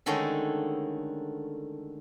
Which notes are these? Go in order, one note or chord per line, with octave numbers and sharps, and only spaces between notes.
D3 D#3 G#3 A3 C#4